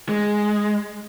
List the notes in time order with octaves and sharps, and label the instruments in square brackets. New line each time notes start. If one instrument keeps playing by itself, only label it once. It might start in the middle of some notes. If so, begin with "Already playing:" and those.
[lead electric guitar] G#3